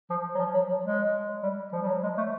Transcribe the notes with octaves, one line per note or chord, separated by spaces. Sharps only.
F3
F#3
F3
F#3
F#3
G#3
G3
F3
G3
F#3
G#3
A3